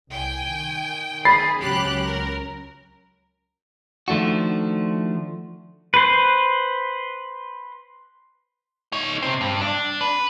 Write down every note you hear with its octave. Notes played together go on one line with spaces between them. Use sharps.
C2 G5 G#5
D#3
G#4 B5 A6 C7
C#2 F#3 C#4 G4 F#6
A#4
D#3 F3 A3 D4 F#4
B4 C5
D#4 C#5
C3 C4
G2
D4
B4